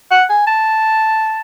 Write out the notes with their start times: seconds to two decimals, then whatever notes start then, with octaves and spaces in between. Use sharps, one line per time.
0.11 F#5
0.29 G#5
0.47 A5